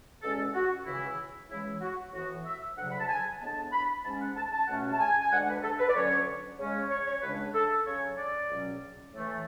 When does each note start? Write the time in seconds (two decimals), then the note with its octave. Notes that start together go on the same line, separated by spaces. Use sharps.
0.23 E2 B2 G#3 C#4 A4
0.55 F#4
0.86 C#2 C#3 E3 E4
1.50 C#3 E3 G#3 E4
1.81 F#4
2.13 A2 E3 B3 F#4
2.45 E5
2.78 D2 C#3 F#3 F#5
2.91 B5
3.00 A5
3.09 G#5
3.41 A2 G#3 B3 D4 A5
3.72 B5
4.05 G#2 G#3 C#4 A5
4.21 F#5
4.37 A5
4.52 A5
4.68 C#2 B2 A3 C#4 F#5
4.93 A5
4.99 G#5
5.20 G#5
5.32 D2 D3 G#3 D4 F#5
5.48 B4
5.63 A4
5.79 B4
5.89 D5
5.95 D2 D3 F#3 C#4 C#5
6.59 C#3 G#3 C#4
6.76 C#5
6.91 C#5
7.06 C#5
7.23 C#2 C#3 G#3 D4 B4
7.54 A4
7.86 C#3 F#3 C#4 C#5
8.18 D5
8.49 C#2 B2 F#3 C#4
9.13 A2 E3 A3